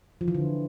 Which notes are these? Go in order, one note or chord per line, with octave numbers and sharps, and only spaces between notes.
F3
E3
D3